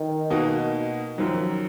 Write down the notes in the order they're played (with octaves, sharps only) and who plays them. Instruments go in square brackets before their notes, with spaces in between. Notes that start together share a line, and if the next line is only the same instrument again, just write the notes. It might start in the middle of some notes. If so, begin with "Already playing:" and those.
Already playing: [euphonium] D#3
[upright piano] B2 A#3 D#4 F#4
[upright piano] F#2 D#3 F#3 [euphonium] F3